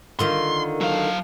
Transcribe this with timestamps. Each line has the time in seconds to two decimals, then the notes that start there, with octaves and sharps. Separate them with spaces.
0.19 D3 D#3 F4 C6
0.81 F#3 F5